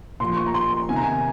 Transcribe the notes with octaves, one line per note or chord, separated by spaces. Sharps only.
A#2 F3 C6
C#6
A#5
C6
C3 D#3 G#5
A#5
G#5